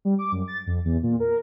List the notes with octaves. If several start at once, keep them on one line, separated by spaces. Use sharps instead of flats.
G3
D6
F#2
A6
F2
E2
A#2
A#4